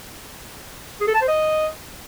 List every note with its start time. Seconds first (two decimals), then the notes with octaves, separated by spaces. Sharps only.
1.01 G#4
1.08 A4
1.14 A5
1.21 C5
1.28 D#5